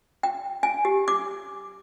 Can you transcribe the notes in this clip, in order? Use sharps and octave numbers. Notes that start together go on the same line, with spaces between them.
G5
G#5
G4
D6